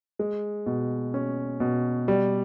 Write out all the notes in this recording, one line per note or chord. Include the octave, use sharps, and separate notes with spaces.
G#3
B2
C#4
B2
G3